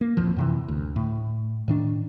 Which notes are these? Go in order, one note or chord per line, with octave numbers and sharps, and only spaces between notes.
A#3
D#1 A1 F2 F3
F#2 C3 E3
D2
A2
A2 D#3 D4